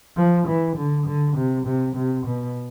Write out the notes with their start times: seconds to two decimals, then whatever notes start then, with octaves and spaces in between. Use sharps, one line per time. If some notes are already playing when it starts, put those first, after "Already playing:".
0.17 F3
0.47 E3
0.77 D3
1.07 D3
1.36 C3
1.66 C3
1.95 C3
2.26 B2